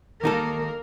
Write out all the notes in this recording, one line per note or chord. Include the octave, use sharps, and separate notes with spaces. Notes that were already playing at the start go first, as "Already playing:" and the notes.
D#2 A#3 D#4 A4 A#4